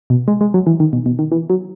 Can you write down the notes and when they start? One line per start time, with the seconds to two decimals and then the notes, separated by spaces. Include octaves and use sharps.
0.10 B2
0.28 G#3
0.41 G#3
0.54 F#3
0.67 E3
0.80 D#3
0.93 B2
1.06 B2
1.19 D#3
1.32 E3
1.50 F#3